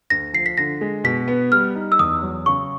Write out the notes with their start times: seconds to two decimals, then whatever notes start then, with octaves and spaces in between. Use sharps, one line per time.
0.10 D2 A#6
0.33 F3 C7
0.46 B6
0.57 D3 A#6
0.81 G#3
1.04 B2 B6
1.28 B3
1.52 G3 F6
1.75 D#4
1.92 E6
1.99 E2 D#6
2.23 F#3
2.46 C#3 C#6